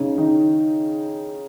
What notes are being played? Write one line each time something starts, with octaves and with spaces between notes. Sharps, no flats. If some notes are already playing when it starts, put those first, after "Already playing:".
Already playing: C#3 C#4 D#4
D#3 D#4